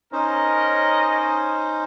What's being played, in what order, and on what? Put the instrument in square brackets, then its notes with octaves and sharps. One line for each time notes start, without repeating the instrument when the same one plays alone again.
[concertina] C#4 D#4 C5 [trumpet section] A#4 C#5 D#5